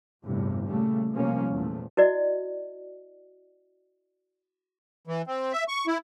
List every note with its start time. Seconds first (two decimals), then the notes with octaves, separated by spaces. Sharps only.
0.23 G1 E2 A2 C3
0.65 A#2 C#3 G3 A3
1.12 B1 C3 F3 G3 A#3 C#4
1.51 E2 A#2 F3 A3
1.97 E4 F#4 D5 D#5
5.07 E3
5.27 C4
5.53 E5
5.68 C#6
5.87 E4